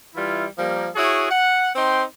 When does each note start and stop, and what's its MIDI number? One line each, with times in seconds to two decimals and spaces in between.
0.15 0.46 52
0.15 0.46 55
0.15 0.46 64
0.15 0.46 65
0.59 0.89 53
0.59 0.89 55
0.59 0.89 58
0.95 1.26 64
0.95 1.26 66
0.95 1.26 68
0.95 1.26 73
1.30 1.70 78
1.76 2.04 60
1.76 2.04 63
1.76 2.04 79
1.76 2.04 84